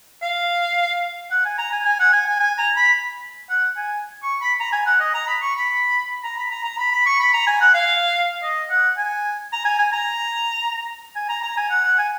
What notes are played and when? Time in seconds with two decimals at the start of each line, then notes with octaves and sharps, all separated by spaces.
0.22 F5
1.31 F#5
1.45 G#5
1.58 A#5
1.72 G#5
1.85 G#5
2.00 F#5
2.13 G#5
2.26 G#5
2.40 G#5
2.58 A#5
2.76 B5
3.49 F#5
3.77 G#5
4.23 C#6
4.41 B5
4.60 A#5
4.73 G#5
4.86 F#5
5.00 D#5
5.14 A#5
5.27 B5
5.42 C#6
5.56 B5
6.24 A#5
6.37 B5
6.51 A#5
6.64 A#5
6.78 B5
6.92 B5
7.06 C#6
7.20 B5
7.34 A#5
7.47 G#5
7.61 F#5
7.74 F5
8.43 D#5
8.70 F#5
8.98 G#5
9.52 A#5
9.65 G#5
9.79 G#5
9.93 A#5
11.16 G#5
11.29 A#5
11.43 A#5
11.57 G#5
11.70 F#5
11.85 F#5
11.98 G#5